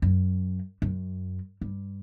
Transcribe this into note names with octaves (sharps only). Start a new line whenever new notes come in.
F#2
F#2
G2